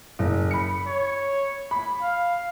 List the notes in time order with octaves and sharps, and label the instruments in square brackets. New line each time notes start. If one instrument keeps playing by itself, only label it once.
[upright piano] F#1
B5 C#7
[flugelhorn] C#5
[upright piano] B5
[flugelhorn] F5